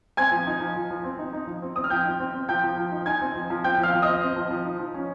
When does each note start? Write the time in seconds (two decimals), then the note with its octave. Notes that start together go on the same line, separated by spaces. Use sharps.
0.17 C4 G#5 G#6
0.31 F3
0.47 D#4
0.61 F3
0.76 F3
0.90 F3
1.04 C4
1.19 D#4
1.33 D#4
1.47 F3
1.62 C4
1.76 C4 D#6
1.84 F6
1.90 F3 G5 G6
2.05 D#4
2.20 C4
2.34 C4
2.49 F3 G5 G6
2.64 F3
2.77 F3
2.92 D#4
3.06 D#4 G#5 G#6
3.21 C4
3.36 F3
3.50 F3
3.64 C4 G5 G6
3.78 F3
3.83 F5 F6
3.94 F3
4.02 C4 D#5 D#6
4.22 C4
4.36 F3
4.50 F3
4.65 D#4
4.79 F3
4.94 C#4